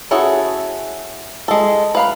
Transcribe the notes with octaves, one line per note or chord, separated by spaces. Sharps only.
C#4 E4 F#4 G#4 A4
G#3 A4
B4 F5 B5